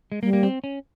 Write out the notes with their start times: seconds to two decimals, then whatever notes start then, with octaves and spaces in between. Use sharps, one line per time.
0.12 G#3
0.22 G3 A#3
0.33 A#3
0.43 C4
0.64 C#4